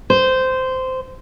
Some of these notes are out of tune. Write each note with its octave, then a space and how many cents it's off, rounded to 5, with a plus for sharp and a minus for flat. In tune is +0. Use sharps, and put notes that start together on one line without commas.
C5 -15